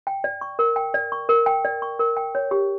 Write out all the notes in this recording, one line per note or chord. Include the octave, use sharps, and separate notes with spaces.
G5
D5
C#6
A#4
G5
D5
C#6
A#4
G5
D5
C#6
A#4
G5
C#5
G4